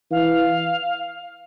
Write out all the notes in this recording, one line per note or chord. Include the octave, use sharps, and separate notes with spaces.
E3 F5